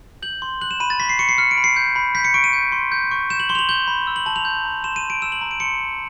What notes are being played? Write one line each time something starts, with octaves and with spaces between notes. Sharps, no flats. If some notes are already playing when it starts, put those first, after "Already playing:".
G6 F#7
C6
F#6 F#7
E7
B5 D#7
A6
C#6 B6
C7
C#6 C#7
C7
F6 C#7
D7
B5
C7
G6
B5
G6 B6
C#7
C#6 D7
D#7
G6
C6
G6
C#6
G6 E7
F#7
C6 G7
F7
F#7
G6 G7
B5
E6
F#7
A5 F#7
F7
G6
A#5
C6 E7
D#7
C6
D7
E6 E7
F#7
A#5
D7
C6 C#7